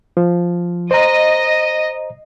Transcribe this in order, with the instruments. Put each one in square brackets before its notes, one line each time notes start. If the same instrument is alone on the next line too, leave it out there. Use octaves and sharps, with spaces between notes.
[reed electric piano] F3
[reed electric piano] C5 A#5 [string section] D#5